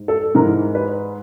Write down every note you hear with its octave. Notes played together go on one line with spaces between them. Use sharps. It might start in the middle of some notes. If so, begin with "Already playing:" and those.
Already playing: G#2
A4
G#2 E3 A#4
B4